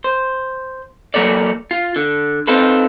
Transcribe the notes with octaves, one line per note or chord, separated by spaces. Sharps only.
C5
F#3 A#3 A4 C#5 D5
F4
D3
C4 D#4 F4 A4 B4